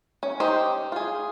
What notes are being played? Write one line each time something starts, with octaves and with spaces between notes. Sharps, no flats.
C#4
D#4 G4 C5
F4 G#4